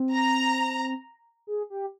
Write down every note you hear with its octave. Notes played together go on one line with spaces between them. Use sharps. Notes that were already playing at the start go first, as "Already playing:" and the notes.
Already playing: C4
A#5
G#4
G4